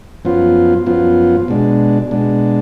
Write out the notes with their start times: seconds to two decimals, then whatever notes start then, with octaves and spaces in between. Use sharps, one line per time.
0.25 F#2 F3 B3 F4
0.86 F#2 F3 B3 F4
1.48 B2 G#3 D4
2.11 B2 G#3 D4